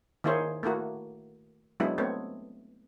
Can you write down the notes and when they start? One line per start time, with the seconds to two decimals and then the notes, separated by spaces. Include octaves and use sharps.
0.24 D#3 A#3 E4 G#4 C5 C#5
0.63 A3 A#3 E4 F#4
1.80 F#3 G#3 B3 D4 E4
1.98 A3 B3 C4 C#5